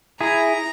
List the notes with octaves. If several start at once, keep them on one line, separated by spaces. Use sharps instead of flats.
E4 G#4 A#5